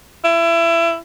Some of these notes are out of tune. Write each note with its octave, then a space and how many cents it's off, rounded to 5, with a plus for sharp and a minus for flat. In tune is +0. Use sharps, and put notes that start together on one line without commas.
E4 +25